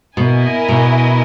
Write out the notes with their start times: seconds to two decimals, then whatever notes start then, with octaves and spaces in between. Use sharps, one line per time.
0.17 B2 E4 A#4 D#5 G#5
0.68 B2